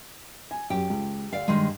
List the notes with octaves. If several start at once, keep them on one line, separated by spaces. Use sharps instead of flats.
G#5
F#2 G4
C#2
D2 D5 F5
G2 D#3 G3 G#3 C6